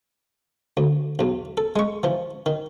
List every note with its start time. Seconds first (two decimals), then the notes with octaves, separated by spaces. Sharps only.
0.77 D2
1.19 B1 E2
1.57 A4
1.76 G#3 C#6
2.03 E3 F3
2.46 D#3